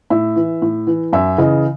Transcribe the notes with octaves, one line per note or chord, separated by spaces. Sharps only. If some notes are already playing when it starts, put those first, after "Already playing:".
A2 E5
E3
A2
E3
F#2 E5
C#3 E3 D#5